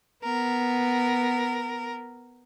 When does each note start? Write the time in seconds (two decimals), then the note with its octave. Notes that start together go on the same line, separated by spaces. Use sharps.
0.24 B3 A#4